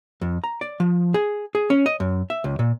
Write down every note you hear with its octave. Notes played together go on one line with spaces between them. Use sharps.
F2
A#5
D5
F3
G#4
G#4
C#4
D#5
F#2
E5
C#2
A#2